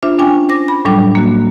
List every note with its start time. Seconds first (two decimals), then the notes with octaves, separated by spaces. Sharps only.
0.02 D4 F4 C5 E5
0.19 C#4 D4 G5 G#5
0.49 C5 D6 A#6
0.68 B5
0.85 A2 F#3 G3 D4 G5
1.15 A#3 F#4